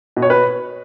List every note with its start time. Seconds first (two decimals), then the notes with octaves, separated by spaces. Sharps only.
0.17 B2
0.22 C#5
0.30 B4